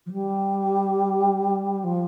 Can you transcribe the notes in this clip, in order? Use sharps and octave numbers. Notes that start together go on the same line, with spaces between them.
F3
G3
F3